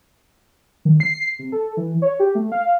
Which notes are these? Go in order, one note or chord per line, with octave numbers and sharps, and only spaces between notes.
D#3
C7
C3
A4
E3
C#5
G4
A3
F5